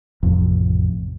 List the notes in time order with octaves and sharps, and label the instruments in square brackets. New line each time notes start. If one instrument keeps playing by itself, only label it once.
[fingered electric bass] A1 F2 C3